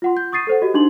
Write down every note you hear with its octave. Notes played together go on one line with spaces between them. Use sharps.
F4 F#5 C6
G6
C#6 D#6 A6 C7 D#7
A4 C5 F#5
F#4 G4 D#5
D4 D#4 C6 F#7